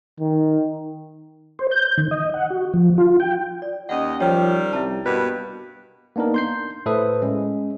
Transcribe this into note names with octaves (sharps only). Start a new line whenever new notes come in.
D#3
C5
G6
D#3
D#5
F#5
F#4
F3
F4
G5
D5
D#2 C#4 D#5 F#5
D#3 F3 G3 C#5 G5
C2 E5 A5
G2 B2 A#3 B4
A#3 B3 D4 D#4 A#4
C6 G6 C7
A2 A4 B4 C5 E5 D#6
G#3 C#4